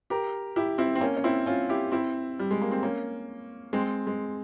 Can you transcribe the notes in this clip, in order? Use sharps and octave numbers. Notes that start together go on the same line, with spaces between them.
G4 A#4
E4 G4
C4 E4
C4
A#3 C#4
C#4
C4 E4
C#4 F4
E4 G4
C4 E4
G3
G#3
A#3
C4
A#3 C#4
G#3 C4
G#3